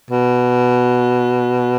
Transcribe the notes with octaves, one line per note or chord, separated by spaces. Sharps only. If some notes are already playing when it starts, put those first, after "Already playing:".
B2